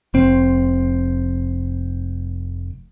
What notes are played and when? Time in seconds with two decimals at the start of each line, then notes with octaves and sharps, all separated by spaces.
0.14 F1 C4